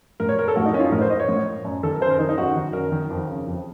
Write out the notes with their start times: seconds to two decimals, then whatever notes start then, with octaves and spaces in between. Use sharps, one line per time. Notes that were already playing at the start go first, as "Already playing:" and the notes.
0.20 A2 A#4
0.29 C#5
0.39 A#4
0.48 A4
0.56 A2 F#4
0.66 D#4
0.74 C#4
0.80 F4
0.84 D#4
0.92 A2 A#4
1.01 C5
1.10 D#5
1.20 C#5
1.29 A2
1.65 F#2
1.83 D#3 A4
1.93 A#4
2.01 F#2 C5
2.11 A#4
2.19 D#3 D#4
2.29 D#4
2.37 F#2 F#4
2.55 D#3
2.73 F#2 A#4
2.92 D#3
3.10 F2
3.27 C#3
3.47 F2